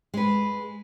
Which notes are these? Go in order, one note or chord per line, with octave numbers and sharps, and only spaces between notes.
G#3 B4